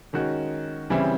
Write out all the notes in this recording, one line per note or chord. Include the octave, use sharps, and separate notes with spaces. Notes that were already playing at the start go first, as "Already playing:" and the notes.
D#3 G#3 C#4 F#4
C#3 E3 G3 C4 E4